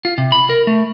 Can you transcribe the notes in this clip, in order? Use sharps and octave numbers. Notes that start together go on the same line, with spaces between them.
F4
C3
B5
A#4
A3